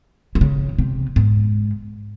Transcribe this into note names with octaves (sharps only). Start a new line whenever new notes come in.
D#3
C#3
C3
G#2